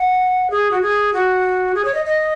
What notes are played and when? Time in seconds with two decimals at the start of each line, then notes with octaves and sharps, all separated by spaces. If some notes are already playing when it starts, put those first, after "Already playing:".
Already playing: F#5
0.51 G#4
0.71 F#4
0.82 G#4
1.13 F#4
1.75 G#4
1.85 C#5
1.94 D#5
2.05 D#5